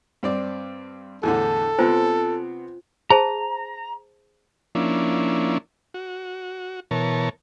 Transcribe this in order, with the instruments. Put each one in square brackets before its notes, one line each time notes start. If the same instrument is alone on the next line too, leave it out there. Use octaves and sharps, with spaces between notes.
[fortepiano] G2 C4 D5
[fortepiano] E2 A2 D3 [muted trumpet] A4
[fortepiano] C3 B3 C4 [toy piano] F4 C5 G#5
[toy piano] G#4 C5 A5 [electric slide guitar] A#5
[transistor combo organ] F3 A#3 C#4 D4 E4
F#4
B2 E3 A#4 C#5 A5